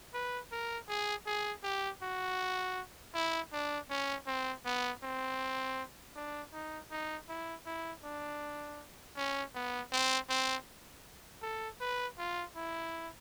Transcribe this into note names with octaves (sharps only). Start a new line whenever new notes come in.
B4
A#4
G#4
G#4
G4
F#4
E4
D4
C#4
C4
B3
C4
D4
D#4
D#4
E4
E4
D4
C#4
B3
C4
C4
A4
B4
F4
E4